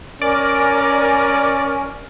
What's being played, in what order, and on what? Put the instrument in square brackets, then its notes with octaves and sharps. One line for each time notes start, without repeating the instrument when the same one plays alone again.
[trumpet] C#4 [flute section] A#4 G#5 [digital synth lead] D5